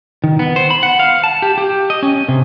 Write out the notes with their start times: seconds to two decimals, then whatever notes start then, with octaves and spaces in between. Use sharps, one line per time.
0.24 D#3
0.39 B3
0.56 C5
0.70 B5
0.83 F#5
1.00 F5
1.24 A5
1.42 G4
1.58 G4
1.90 D#5
2.03 C#4
2.28 C3